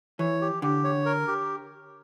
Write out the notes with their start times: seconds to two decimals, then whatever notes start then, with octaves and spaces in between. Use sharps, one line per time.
0.19 E3 C#5
0.41 G4
0.62 D3 G4
0.84 C#5
1.06 A#4
1.28 G4